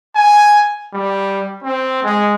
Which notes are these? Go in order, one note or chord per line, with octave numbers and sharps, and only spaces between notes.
G#5
G3
C4
G#3